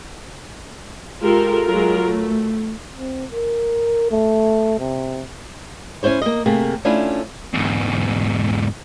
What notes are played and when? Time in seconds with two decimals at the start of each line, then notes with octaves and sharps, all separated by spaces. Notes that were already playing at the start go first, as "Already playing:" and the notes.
1.21 G#3 F4 G4 A4 A#4
1.66 F#3 G#3 F4 A#4
2.03 A3
2.95 C4
3.32 A#4
4.11 A3
4.79 C3
6.03 C#4 D4 E4 C5 C#5
6.22 A#3 D#5
6.46 C3 A3 A#3 G#4
6.85 A3 C#4 D4 E4 F4
7.53 E2 G#2